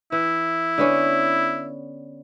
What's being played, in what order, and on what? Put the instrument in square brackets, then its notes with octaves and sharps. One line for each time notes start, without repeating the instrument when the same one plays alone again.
[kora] E3 [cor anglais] E4
[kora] D3 B3 C#4